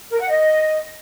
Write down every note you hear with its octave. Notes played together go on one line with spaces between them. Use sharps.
A#4
F#5
D#5